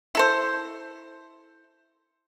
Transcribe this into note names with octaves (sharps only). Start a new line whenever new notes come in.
E4 A4 C5